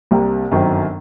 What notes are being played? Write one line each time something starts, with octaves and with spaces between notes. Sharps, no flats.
C2 C3 G3 A#3
G1 F#2 D#3 F#3 C4